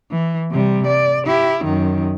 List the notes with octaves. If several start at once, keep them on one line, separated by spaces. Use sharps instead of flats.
E3
C3 G3
D5
E4 G4
F#2 D#3